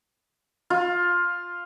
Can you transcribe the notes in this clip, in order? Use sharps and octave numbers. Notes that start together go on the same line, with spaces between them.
F4